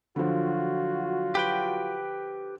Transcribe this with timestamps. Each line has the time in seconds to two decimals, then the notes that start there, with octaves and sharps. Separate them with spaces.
0.16 D3 F3 F#3 F4 F#4
1.35 G4 B4 G5